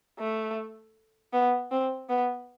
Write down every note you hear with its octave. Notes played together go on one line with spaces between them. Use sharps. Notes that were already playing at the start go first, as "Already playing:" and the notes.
A3
B3
C4
B3